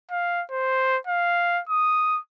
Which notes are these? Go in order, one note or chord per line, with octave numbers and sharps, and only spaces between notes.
F5
C5
F5
D#6